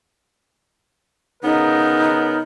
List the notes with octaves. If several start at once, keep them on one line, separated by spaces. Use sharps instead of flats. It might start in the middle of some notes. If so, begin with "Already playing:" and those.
C#3 B3 D#4 A#4